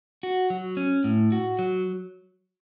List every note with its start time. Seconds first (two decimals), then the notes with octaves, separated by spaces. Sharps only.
0.23 F#4
0.50 F#3
0.77 C#4
1.04 A2
1.32 F#4
1.59 F#3